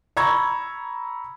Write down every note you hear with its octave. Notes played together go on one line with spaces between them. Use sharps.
A#5 B5 C#6 E6 G#6